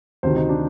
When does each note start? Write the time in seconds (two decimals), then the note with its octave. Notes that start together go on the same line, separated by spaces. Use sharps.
0.23 D2 C3 D#3 C5
0.36 D#4
0.49 D4